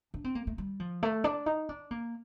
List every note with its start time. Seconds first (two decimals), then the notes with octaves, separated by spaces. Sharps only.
0.14 D4
0.24 C4
0.35 A#3
0.47 A3
0.58 G3
0.80 F3
1.03 A3
1.24 D4
1.46 D#4
1.69 D4
1.91 A#3